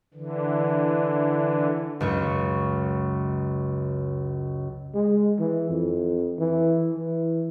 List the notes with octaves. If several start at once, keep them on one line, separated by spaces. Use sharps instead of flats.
D3 E3
C#2 F#2 C#6
G#3
E3
F2
E3
E3